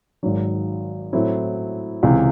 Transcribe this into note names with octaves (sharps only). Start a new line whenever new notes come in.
G#1 G#2 D#3 F#3
A2 F#3 C4 E4
C#2 C3 E3